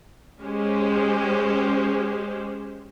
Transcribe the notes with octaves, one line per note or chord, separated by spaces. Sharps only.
G#3 C#4 G4 C5